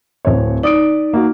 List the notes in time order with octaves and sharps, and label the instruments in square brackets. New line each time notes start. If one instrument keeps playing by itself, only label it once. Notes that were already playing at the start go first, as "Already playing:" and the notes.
[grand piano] D1 C4 C#5
[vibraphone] D#4 [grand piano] D5 D#6 D7
[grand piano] A#3 F#4